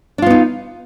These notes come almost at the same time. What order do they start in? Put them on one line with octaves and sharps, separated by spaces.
D4 F4 B3 D#4